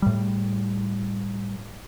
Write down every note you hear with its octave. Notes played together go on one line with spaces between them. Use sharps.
A2 G3